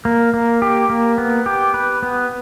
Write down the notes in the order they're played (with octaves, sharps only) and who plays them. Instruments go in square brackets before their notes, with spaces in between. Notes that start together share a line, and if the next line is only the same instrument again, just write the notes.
[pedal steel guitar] A#3
A#3
G4
A#3
B3
G4
B4
B3